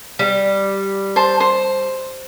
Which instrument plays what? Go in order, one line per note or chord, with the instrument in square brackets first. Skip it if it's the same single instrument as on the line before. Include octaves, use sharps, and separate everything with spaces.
[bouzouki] G3
[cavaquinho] C5 A5
C5